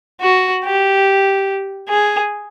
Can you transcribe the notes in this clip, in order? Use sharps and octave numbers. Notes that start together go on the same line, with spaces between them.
F#4
G4
G#4